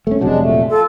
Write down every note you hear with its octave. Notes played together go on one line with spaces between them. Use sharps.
A3 C#4
F1 C3 F#3 G#3 D4
A#2 A3
F4 A4